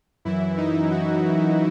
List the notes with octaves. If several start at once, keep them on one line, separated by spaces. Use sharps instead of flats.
F#2 E3 E4
D#4
F#4